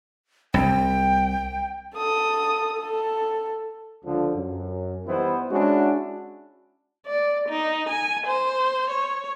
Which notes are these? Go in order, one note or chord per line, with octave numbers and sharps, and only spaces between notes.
C2 G5
A4 D#6
A4
C#2 D3 F3
F#2
E3 G3 B3 D#4 E4 C5
G#3 C#4 D4 E4 F#4
D5
D#4
G#5
C5
C#5